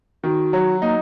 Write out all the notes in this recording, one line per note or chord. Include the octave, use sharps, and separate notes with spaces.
D#3 F#4
F#3
A#3 D#4